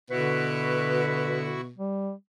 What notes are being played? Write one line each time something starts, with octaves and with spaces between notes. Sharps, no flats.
B2 D3 E4 F#4 B4 C#6
G3